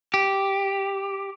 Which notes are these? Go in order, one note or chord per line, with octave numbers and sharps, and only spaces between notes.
G4